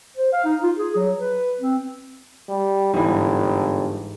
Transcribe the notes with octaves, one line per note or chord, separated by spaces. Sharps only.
C5
F5
D#4
F4
G#4
F#3
B4
C4
G3
G1 G#2 E3